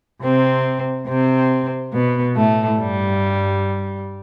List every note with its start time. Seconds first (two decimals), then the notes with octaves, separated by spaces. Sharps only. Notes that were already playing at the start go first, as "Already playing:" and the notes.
0.22 C3 C4
1.08 C3 C4
1.93 B2 B3
2.36 A2 A3
2.79 G2 G3